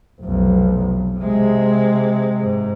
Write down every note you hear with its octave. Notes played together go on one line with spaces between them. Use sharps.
F1 B1
C3 G#3
G#2